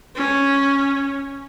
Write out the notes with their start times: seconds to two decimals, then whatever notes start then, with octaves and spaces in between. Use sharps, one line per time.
0.16 C#4